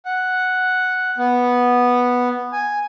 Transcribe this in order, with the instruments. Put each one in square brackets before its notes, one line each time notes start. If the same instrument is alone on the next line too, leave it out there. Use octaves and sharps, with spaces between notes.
[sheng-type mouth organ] F#5
B3
G#5